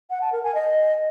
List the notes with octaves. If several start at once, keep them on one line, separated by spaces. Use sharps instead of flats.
F#5
A5
A#4
G#5
D#5